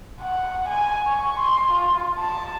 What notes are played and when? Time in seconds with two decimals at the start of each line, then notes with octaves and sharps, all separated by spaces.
0.21 F#5
0.68 G#5
1.07 C#6
1.39 C6
1.72 F4
2.19 A5